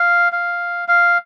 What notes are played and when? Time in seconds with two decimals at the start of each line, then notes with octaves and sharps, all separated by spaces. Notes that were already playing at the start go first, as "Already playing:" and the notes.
Already playing: F5
0.32 F5
0.88 F5